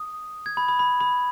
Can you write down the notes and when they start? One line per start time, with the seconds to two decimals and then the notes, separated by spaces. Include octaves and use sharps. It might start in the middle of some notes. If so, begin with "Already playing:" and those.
Already playing: D#6
0.46 G#6
0.57 B5
0.68 B5
0.79 B5
1.01 B5